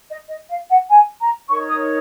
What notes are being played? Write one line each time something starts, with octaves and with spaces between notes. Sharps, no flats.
D#5
D#5
F5
F#5
G#5
A#5
D#4 A#4 C#5 C#6
D#6